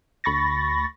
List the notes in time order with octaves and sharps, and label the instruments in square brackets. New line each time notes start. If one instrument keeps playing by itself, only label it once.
[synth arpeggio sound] D2 B5 C#6 A6 A#6